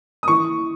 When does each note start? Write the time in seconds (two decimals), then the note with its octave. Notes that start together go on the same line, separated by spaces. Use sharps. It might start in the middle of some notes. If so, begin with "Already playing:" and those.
0.23 D#6
0.28 E3 C#6